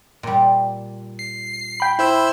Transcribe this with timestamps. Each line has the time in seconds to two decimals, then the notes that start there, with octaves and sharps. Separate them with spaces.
0.23 A#2 G3
1.19 C7
1.80 G5 B5
1.99 E4 C5 E6